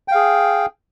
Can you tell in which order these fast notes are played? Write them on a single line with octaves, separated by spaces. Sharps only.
G5 F5 G#4